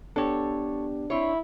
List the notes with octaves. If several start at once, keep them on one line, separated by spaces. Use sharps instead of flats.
B3 D4 G4 A4 C#5
C4 E4 C#5